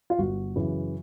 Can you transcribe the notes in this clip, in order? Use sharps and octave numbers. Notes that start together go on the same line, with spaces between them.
F4
G1 F#4
F#2 C#3 E3